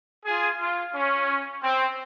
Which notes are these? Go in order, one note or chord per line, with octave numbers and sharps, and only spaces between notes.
F4 G#4
F4
C#4
C4